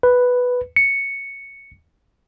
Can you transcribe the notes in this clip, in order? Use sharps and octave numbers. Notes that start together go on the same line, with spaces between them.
B4
C#7